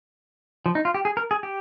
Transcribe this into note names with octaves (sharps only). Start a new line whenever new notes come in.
F3
D#4
F4
G4
G#4
A#4
G#4
G4